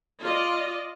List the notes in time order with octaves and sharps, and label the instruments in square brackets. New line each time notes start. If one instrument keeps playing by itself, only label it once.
[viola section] F4 D5 D#5